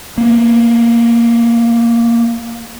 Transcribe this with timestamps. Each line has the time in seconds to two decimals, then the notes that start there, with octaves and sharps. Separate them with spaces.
0.18 A#3 B3